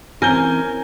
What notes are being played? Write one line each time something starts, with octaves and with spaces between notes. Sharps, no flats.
E3 C4 C#4 A#4 G#5 G6 G7